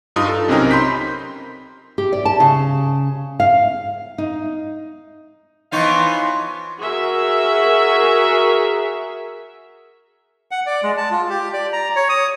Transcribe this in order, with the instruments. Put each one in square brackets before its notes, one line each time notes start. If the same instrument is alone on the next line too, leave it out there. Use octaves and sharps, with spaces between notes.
[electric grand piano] G2 D#4 F4 D#6
A4
B1 C3 C4 C#4 D#4 A#4
B5 C6 G6 B6
[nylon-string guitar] G4
D5
A5
C#3
F5
D#4
[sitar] E3 B3 D#4 [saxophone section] F3 C#5 F5 [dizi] C6
[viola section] F#4 G#4 A#4 E5
[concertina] F#5
D5
G#3
A5
F4
G4
D5
A#5
C#5
D#6